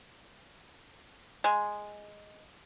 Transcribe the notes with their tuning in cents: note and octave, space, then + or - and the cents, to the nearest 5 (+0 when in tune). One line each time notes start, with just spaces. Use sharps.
G#3 +0